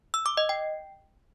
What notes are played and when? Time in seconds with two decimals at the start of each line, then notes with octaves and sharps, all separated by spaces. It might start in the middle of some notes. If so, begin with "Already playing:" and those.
0.14 E6
0.26 D6
0.37 D#5
0.49 G5